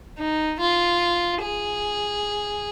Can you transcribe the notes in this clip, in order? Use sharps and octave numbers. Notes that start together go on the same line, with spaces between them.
D#4
F4
G#4